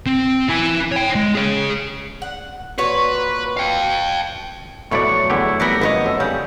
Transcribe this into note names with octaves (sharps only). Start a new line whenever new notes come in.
C4
E4 G#5
C#5 G5
G#3
G#4 C#5
F#5
A#2 F#4 B4 C#5
F5 G5
F2 B2 F#3 A3 E4 D5 C#6
E2 D3 E4 G4
E3 G3 B3 A#4
G1 B3 B4 C#5 D#5
F#2 A4
C#3 G3 G5